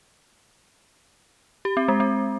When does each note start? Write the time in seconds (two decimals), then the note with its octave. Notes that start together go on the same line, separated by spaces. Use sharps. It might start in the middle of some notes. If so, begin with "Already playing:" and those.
1.65 G4
1.77 C4
1.88 G#3
2.00 C4